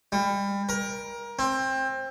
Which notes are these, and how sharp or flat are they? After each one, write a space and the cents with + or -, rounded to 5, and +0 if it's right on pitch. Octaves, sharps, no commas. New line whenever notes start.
G3 +30
A#4 +25
C4 +20